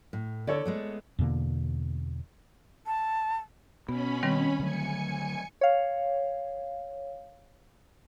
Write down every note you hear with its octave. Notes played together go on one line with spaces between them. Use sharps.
A2
D3 A4 C#5 D5
G#3 A3 B3
E2 B2 D3 A#3
A5
B2 B3 C#4 B5
D#3 G3 C4
D3 F#3 A3 G#5 C#7
C#5 F5